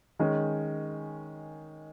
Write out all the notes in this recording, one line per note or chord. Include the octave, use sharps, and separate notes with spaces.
D#3 G#3 C#4